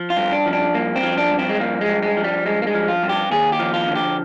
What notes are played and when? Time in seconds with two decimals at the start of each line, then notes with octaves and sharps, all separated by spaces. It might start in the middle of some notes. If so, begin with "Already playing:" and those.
Already playing: F3
0.10 F4
0.17 G2
0.32 D4
0.46 F3
0.53 D4
0.74 G2 A#3
0.96 C4
1.03 F3
1.18 D4
1.31 G2
1.38 C4
1.49 G#3
1.60 F3 A#3
1.81 G#3
1.89 G2
2.03 G#3
2.17 F3
2.24 G3
2.46 G2 G#3
2.62 A#3
2.67 G#3
2.74 F3
2.88 F4
3.03 G2
3.09 G4
3.31 D#2 G#4
3.52 G4
3.59 F3
3.74 F4
3.88 D3
3.95 G4